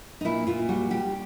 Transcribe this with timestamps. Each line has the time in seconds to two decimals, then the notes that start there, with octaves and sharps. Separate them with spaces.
0.21 D#4
0.25 A#2 E4
0.47 A#2 F4
0.69 G3 F#4
0.90 G3 G4